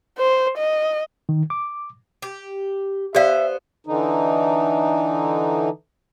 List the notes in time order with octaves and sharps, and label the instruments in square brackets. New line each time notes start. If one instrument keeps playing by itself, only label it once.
[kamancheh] C5
D#5
[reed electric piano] D#3
D6
[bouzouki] G4
[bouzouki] B3 C5 [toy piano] G4 D5 F5 [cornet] E5
[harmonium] D3 E3 D#4